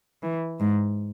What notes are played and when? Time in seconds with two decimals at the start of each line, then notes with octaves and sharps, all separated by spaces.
0.23 E3
0.60 G#2